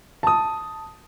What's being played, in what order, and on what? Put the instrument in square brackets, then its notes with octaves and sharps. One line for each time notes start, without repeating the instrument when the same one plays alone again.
[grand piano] A5 D#6